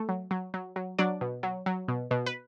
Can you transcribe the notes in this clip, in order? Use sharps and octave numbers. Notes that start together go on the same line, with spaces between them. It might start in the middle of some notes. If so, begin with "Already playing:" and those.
Already playing: A3 A4
F#3
F#3
F#3
F#3
F#3 D4 D5
B2
F#3
F#3
B2
B2
B4